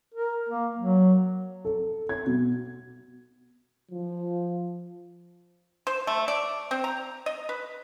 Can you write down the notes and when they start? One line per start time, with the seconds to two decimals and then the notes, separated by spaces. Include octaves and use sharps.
0.14 A#4
0.49 A#3
0.78 F#3
1.65 A4
2.09 G#6
2.26 B2
3.91 F3
5.87 C5
6.07 A3
6.28 D5
6.71 C4
6.84 A#5
7.26 D#5
7.49 B4